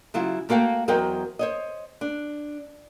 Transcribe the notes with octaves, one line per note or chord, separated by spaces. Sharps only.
C#3 F#3 E4 F4
A3 A#3 F#4 F5 G5
E2 F#3 A#4 C5 D#5 G5
C5 C#5 D#5
D4